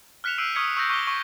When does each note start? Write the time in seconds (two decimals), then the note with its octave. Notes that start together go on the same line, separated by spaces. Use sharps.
0.24 F6 F#6 B6 C#7 E7 F7
0.38 E6 G6 C7 D7 D#7
0.55 C#6 D#6 F6 G#6 B6 C#7
0.77 C#6 E6 G6 A#6 C#7
0.89 C#6 D6 F6 B6 F7 G7
1.07 C#6